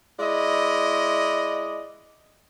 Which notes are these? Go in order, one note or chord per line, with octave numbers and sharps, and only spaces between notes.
G#3 E4 D5 D#5